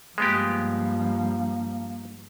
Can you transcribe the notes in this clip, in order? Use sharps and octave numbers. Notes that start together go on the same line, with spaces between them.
G2 F3 G#3 A#3 B3 G4